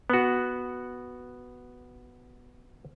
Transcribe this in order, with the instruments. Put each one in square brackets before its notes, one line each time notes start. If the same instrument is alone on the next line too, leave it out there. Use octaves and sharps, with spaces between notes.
[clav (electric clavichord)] B3 F#4